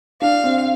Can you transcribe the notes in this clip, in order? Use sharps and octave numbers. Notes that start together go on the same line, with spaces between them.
D4 F5
C4